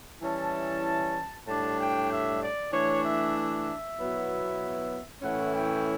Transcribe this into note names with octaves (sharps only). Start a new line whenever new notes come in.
E3 G3 C#4 E4 A5
A2 G3 D4 A5
G5
E5
D5
E3 A3 D4 C#5
E5
E5
B2 F#3 B3 E4
A2 E3 A3 C#4 E4 F#5
G5